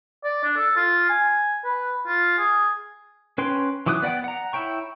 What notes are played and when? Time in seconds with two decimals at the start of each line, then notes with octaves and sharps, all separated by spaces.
0.24 D5
0.43 D4
0.56 A4
0.76 F4
1.09 G#5
1.64 B4
2.07 F4
2.38 G#4
3.38 C#4 B4 C#5 G5 C6
3.86 E3 F#3 D6 D#6 F#6
4.02 B3 D5 F#5 G5
4.24 F#5 A#5
4.53 E4 C#5 G5 C#6